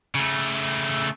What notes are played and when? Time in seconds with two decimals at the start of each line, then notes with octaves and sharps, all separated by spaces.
0.15 C#3 A3